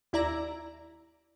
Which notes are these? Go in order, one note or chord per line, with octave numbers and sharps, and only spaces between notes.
D#2 E4 D5 A#5